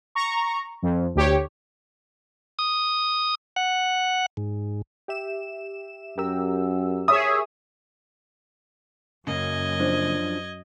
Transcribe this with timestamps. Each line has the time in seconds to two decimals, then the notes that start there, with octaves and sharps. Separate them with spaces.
0.15 A#5 C#6
0.82 F2
1.15 D2 G4 C#5
2.59 D#6
3.56 F#5
4.37 G#2
5.08 G4 E5 E7
6.18 F#2 G4 A#4 E6
7.08 G#4 C#5 E5 D#6
9.27 F#2 C#3 A#3 D#5 G#6
9.79 F3 D4 D5